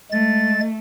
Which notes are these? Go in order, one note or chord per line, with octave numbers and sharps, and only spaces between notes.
G#3 A3 A6